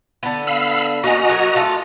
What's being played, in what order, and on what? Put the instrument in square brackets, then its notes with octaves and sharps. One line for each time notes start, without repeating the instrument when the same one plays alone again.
[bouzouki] D3 B3
[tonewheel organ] F5 B5 E6
[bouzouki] A#3 C#4 [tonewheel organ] F#4 D#5 A#5
[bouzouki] F#3 A#4
A3 F4